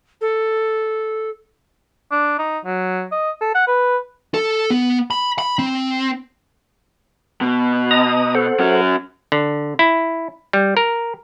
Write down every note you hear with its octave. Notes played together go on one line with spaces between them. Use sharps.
A4
D4
D#4
F#3
D#5
A4
F#5
B4
A4
B3
B5
B5
C4
B2
D#5 A#5 D#6
A4 C5 F#5
C#4 F#4
D3
E4
G3
A#4